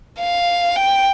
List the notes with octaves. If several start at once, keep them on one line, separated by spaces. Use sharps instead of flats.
F5
G5